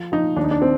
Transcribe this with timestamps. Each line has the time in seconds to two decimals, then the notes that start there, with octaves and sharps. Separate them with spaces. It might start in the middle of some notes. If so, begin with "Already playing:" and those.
Already playing: F3
0.12 F3 D#4
0.36 D#2 D4
0.44 D#4
0.51 D4
0.62 C4